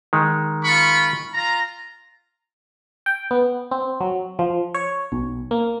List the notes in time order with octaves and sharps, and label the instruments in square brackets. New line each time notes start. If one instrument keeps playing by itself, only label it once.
[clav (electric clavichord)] D#3 G#3
[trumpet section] F4 B5 C#6
F4 A#5
[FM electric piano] G5
B3
C4
F#3
F3
C#5
B1
A#3